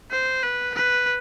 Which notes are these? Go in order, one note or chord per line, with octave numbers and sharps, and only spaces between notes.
C5
B4
B4